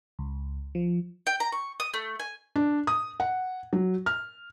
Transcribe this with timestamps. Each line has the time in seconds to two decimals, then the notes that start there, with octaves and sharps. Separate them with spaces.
0.19 C#2
0.75 F3
1.27 G5
1.40 A#5
1.52 C#6
1.80 D#6
1.94 A3
2.20 G#5
2.56 D4
2.87 D#6
3.20 F#5
3.73 F#3
4.06 F6